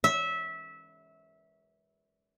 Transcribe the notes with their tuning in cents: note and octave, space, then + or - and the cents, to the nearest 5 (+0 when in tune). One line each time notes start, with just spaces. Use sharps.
E5 -20